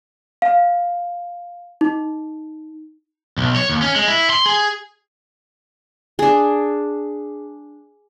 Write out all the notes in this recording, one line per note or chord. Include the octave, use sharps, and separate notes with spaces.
F5
D#4
B1
C#5
D#2
C#4
G#3
E4
C6
G#4
D4 G#4